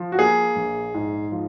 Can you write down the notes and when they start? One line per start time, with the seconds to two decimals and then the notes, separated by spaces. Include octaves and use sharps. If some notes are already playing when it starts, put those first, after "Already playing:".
Already playing: F3
0.12 F#4
0.19 A#3 G#4
0.56 A#1
0.94 G#2
1.32 F3